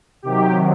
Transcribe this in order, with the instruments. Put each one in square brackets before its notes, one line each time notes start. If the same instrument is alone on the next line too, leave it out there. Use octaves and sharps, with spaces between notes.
[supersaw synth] C3 D#3 F#3 G4